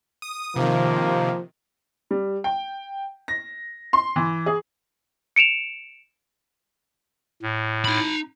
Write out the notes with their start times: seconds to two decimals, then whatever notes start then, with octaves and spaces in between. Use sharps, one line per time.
0.22 D#6
0.56 C3 D#3 F3 A#3
2.11 G3
2.44 G5
3.28 A#6
3.93 C6
4.16 E3
4.46 G#4
5.36 C#7 D7 E7 F7
7.43 A2
7.85 D#4 B5